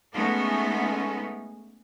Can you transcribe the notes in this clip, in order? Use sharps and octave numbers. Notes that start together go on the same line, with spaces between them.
G#3 A3 B3 C#4 D#4